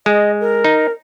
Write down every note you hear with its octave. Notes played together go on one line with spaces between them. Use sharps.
G#3 D#5
A#4
D#4